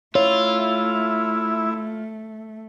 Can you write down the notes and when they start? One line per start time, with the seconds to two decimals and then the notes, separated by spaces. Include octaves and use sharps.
0.15 A3 E4 F4 C#5